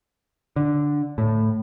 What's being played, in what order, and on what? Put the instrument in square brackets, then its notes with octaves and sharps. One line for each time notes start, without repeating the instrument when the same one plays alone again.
[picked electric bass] D3
A2